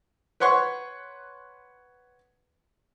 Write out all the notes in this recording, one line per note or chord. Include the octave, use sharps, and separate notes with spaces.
B4 C#5 F#5 C6 C#6